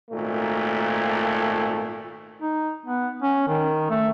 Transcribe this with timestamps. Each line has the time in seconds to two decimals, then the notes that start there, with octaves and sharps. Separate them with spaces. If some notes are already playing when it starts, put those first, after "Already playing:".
0.11 G#1 A#2 A3
2.41 D#4
2.86 B3
3.22 C#4
3.48 D#3
3.90 A3